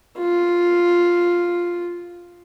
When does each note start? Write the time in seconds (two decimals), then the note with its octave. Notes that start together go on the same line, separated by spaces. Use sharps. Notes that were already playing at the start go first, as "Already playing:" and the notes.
0.18 F4